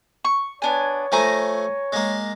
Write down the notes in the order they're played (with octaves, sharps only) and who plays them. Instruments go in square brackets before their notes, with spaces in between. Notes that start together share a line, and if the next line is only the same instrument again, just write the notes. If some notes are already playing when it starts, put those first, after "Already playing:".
[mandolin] C#6
[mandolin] B3 D4 G#5 [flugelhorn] C#5
[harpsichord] F3 A3 [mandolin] B4 G#5 A#5
[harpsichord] G#3 A#3